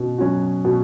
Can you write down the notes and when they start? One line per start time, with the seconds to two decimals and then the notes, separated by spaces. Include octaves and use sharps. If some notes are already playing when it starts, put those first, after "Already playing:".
Already playing: B2 C#4
0.18 F#3 C#4 F#4
0.65 B2